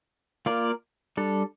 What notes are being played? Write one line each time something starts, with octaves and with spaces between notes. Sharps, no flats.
A#3 F4 A#4 D5
G3 D4 A4